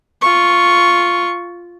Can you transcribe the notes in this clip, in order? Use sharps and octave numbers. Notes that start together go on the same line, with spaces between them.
F4 C#6